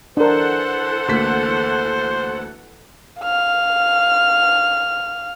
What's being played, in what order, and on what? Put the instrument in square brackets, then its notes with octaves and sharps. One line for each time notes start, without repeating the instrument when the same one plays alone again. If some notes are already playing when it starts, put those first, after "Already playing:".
[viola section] E3 A4 F#5 [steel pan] D4 A#4 [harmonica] C5
[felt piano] D2 A#3 B6
[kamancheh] F5 F6